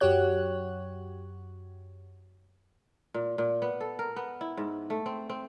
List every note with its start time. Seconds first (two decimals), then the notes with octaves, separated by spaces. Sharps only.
0.01 F#2 F#4 G4 C#5 F#6
3.14 A#2
3.38 A#2
3.62 B3
3.80 A4
3.99 A#4
4.16 B3
4.41 E4
4.57 G#2
4.90 A3
5.06 C4
5.30 C4